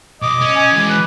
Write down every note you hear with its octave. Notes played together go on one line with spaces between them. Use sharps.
B1 D#5 D6
C#4
G#5
E3 G#3
B4